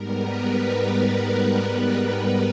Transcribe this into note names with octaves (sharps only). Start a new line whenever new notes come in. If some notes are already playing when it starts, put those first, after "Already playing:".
Already playing: G#2 G3 B3 A#4
B4
A#4